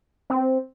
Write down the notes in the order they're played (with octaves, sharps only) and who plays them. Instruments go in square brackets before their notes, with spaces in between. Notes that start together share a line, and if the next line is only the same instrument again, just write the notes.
[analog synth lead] C4